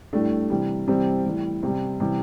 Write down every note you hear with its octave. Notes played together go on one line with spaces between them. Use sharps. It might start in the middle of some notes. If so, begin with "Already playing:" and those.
A2 G3 A3 D4
C3 E3 G3
C3 E3 G3 C4
A2 E3 G3
C3 G3
C3 E3 G3